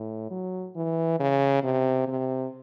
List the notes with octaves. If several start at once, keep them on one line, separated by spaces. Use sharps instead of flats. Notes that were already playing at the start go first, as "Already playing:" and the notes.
Already playing: A2
F#3
E3
C#3
C3
C3